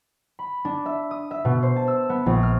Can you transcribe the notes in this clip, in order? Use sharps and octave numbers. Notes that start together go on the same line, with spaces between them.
B5
D4
E5
D#6
E5
B2
C5
A5
E6
B3
A#1
F6